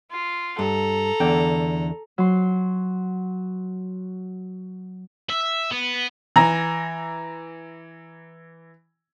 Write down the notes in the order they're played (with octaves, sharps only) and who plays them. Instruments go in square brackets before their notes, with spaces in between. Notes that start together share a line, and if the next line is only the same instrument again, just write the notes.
[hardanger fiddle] F4
[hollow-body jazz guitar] G2 [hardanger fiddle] A4 A#5
[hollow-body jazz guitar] E2 D3 G5
[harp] F#3 C6
[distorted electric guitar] E5
B3
[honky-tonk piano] E3 A#5